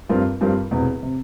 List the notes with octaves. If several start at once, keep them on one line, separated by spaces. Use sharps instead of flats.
G2 G3 C4 F4 A#4
G2 G3 C4 F4 A#4
E1 E2 C3
C3